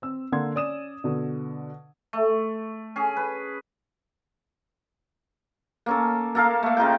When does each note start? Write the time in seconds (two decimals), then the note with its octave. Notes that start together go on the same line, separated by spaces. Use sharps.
0.02 C4 E6
0.32 D3 A#3 F#5 C6 G#6
0.55 C#4 D5 D#6 E7
1.04 B2 D3
2.13 A3
2.96 C#4 G#4
3.17 B4
5.86 A#3 C#4 A4
6.35 A#3 A4 A#4 F5
6.63 A3 A#3
6.77 C#3 D#4 F4 G5